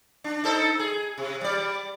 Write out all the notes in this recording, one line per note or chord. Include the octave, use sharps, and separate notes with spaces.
D4
D#4 A4 C5
G#4
C3
G3 D5